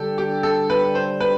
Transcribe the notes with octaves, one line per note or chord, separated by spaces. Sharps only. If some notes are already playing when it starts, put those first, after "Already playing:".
Already playing: D3 G3 D4 G4 A4
G4
A4
B4
C5
B4